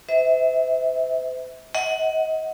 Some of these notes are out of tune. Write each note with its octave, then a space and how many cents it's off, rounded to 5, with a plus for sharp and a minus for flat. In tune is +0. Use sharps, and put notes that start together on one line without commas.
C5 -40 E5 -30
D#5 +30 F#5 +10